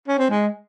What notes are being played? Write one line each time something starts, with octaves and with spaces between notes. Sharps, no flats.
C#4
C4
G#3